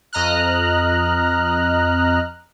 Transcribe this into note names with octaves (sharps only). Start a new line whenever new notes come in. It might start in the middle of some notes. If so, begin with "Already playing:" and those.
F2 D#5 A#5 F6 F#6